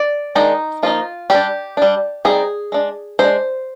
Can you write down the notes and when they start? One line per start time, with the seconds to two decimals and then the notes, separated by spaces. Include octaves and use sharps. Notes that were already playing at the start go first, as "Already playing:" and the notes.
Already playing: D5
0.35 D#3 G#3 D4 D#4
0.83 F3 A#3 D#4 F4
1.30 G3 D4 G4
1.77 G3 D4
2.25 G3 C4 D#4 G#4
2.72 G#3 D4
3.19 G#3 D4 C5